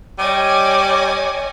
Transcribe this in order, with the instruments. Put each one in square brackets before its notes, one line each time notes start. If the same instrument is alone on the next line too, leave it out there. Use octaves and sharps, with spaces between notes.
[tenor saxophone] G3 [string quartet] C#5 D#5 G#5 [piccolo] D6